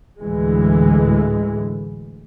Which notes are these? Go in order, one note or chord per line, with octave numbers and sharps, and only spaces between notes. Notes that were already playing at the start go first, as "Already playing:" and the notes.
D2 A2 E3 G#3